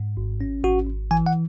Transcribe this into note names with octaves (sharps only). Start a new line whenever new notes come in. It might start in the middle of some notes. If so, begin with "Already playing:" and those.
Already playing: G#2
G#1
C#4
G#1 F#4
G#1
E3 G#5
F#5